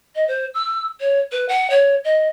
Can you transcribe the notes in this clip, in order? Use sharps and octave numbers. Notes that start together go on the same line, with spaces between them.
D#5
C5
E6
C#5
B4
F#5
C#5
D#5